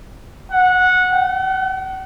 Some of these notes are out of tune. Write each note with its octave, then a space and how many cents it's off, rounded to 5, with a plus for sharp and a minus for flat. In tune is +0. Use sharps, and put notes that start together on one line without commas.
F#5 -15
F#5 +45